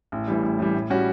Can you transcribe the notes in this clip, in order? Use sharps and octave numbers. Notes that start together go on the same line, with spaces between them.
A1
A2 E3 G3
A1
A2 E3 G3
A2
G3 C#4 F#4